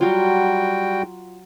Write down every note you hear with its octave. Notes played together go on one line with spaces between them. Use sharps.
F#3 G3 F4 F#4 G5